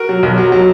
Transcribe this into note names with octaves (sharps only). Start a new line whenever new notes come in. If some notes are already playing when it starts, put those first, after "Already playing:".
Already playing: F#4 A#4
F#3
B1
F#3
F#3